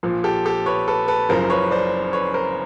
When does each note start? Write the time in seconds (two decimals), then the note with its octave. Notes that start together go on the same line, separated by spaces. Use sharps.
0.03 A#1 A#2 F3
0.24 G4 A4
0.46 G4 A4
0.66 B4 C#5
0.87 A4 B4
1.08 A4 B4
1.29 F#1 F#2 C#3 F3 A#4 C5
1.50 B4 C#5
1.71 C5 D5
2.13 B4 C#5
2.34 A#4 C5